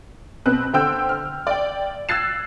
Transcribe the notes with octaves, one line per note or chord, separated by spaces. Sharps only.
B2 C4 B4 F#6
D3 C5 G5 E6 G6
F6
D5 G5
E6 F#6 G#6 A6 C7 E7